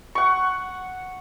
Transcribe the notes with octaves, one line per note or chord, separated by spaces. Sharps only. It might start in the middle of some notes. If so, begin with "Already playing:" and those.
F#5 C#6